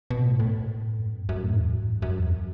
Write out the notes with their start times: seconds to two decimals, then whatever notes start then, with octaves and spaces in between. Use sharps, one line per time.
0.11 B2
0.25 A2
0.40 A2
0.99 F#2
1.29 F#2
1.44 A2
1.59 E2
1.73 A2
1.88 F#2
2.02 F#2
2.18 E2